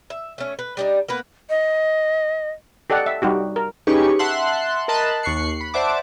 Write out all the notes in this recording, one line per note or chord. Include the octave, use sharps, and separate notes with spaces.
E5
A3 C#4
B4
G3 D4 D#4
A#3 B3 B4
D#5
G4 A4 D5 D#5 F#5
E5
G3 D#4 F#4 G4
A#4
C#4 D#4 G4 G#4 B4 C#6
E5 F#5 A5 C6 F#6
A#4 D#5 A5 B5 C6 F#6
D#2 C#6 F#6 C7 C#7
B5
C5 D5 E5 F#5 A5 D6